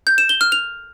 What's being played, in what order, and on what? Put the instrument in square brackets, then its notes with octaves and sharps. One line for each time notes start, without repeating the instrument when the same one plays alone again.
[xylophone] G6
E7
G7
F6
F7